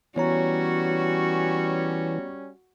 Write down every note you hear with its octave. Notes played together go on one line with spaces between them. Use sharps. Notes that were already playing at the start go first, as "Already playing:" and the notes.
E3 G3 B3 C#4 F#4 C#5 A#5